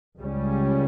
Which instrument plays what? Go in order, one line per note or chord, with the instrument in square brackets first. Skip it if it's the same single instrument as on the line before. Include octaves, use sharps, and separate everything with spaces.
[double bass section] C#2 C#3 G3 C#4